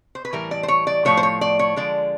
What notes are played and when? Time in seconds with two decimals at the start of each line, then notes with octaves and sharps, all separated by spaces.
0.15 C5
0.25 B4
0.33 A2 E3 G3 A#4
0.51 D5
0.63 C5
0.68 C#5
0.87 D5
1.05 A2 F3 A3 C#5
1.17 C5
1.23 C#5
1.41 D5
1.59 C#5
1.76 D3 F3 G#3 D5